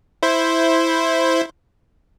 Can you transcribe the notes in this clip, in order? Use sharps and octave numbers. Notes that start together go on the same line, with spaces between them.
E4 C5